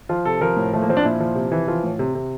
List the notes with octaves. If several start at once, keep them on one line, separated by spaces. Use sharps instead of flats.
F3 F4
C3 A4
F3 A#4
A2
F3 A3
A#3
F3 C4
D4
A#2 E4
F3
C3
E3
F3 F4
A2
C3
C3